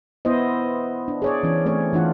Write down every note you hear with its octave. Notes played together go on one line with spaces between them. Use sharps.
B3 E4 C5 D#5
D4
G#4 C#5 D5
E3 C#4
A3 C4 C#5
E3 D4 F4 F#5